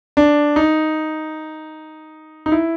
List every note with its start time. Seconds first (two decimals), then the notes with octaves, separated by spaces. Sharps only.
0.17 D4
0.56 D#4
2.46 D#4
2.52 E4